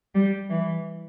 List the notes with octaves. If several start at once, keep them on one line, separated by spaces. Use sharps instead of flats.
G3
E3